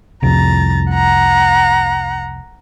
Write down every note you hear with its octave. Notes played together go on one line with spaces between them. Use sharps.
C2 F2 A#5 A6
F#5 A#5